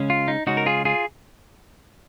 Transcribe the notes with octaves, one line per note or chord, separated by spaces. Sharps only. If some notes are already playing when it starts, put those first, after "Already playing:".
Already playing: C#3 G#3 C#4
F4
D#4
C#3 G#3 C#4 D#4 F#4
A#4
F4 G#4
F4 G#4